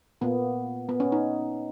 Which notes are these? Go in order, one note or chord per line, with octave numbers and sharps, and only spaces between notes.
A#2 A#3 B3
B3
C#4
D#4